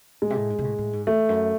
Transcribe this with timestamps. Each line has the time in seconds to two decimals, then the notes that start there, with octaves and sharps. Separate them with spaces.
0.22 A2 G#3
0.30 C3
0.36 A2
0.50 G#2
0.59 C3
0.64 A2
0.78 A2
0.93 G#2
1.07 E2 A3
1.29 F#2